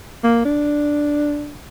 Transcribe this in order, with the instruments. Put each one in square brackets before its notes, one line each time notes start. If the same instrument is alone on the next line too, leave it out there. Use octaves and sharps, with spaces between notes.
[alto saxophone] A#3
D4